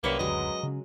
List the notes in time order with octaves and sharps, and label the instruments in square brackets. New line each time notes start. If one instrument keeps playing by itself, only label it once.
[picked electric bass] C2 [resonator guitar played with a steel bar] F#2 B4 C#5 [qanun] G3 D#5 [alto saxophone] A#3
[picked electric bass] F#1 D2 [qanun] F#3 G#3 A#4 [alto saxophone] D#5
[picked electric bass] C#3 C#4